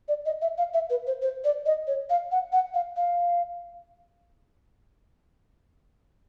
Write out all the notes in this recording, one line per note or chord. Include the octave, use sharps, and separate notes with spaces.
D5
D#5
E5
F5
E5
B4
C5
C5
D5
D#5
C#5
F5
F#5
F#5
F5
F5